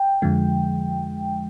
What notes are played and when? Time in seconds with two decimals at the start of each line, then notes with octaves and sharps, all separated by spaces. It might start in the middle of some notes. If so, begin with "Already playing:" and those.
Already playing: G5
0.22 F2 D3 F3 G#3